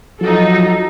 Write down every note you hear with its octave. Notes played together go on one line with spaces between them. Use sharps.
F3 F#3 D#4 A4